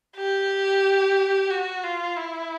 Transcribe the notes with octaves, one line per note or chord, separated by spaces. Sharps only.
G4
F#4
F4
E4